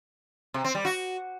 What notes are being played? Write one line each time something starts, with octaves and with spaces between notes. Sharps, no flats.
C3
C4
G3
F#4